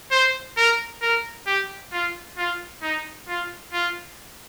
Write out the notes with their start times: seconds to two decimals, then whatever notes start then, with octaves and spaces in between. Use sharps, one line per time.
0.11 C5
0.57 A#4
1.02 A#4
1.47 G4
1.92 F4
2.37 F4
2.82 D#4
3.28 F4
3.73 F4